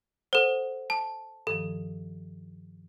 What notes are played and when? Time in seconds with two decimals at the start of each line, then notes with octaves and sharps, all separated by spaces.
0.33 A4 C5 F#5
0.90 A5
1.47 G2 D#3 F3 A4